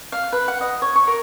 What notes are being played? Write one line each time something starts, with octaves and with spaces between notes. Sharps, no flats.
F5
B4
F#5
D#5
C#5
C#6
A#4